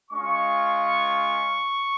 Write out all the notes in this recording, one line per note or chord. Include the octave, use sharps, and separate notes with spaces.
G#3 C#4 F4 C#6